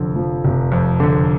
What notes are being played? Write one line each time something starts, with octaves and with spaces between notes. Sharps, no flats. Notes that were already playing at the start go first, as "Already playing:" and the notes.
Already playing: F1 F2 D3
F3
F1
F2
D3